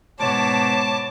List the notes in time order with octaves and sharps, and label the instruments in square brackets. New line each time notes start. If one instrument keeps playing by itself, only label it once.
[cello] G#2 B2 [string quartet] C#5 [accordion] A5 D6